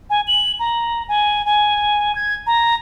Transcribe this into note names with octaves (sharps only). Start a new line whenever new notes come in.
G#5
F#7
A#5
G#5
G#5
G#6
A#5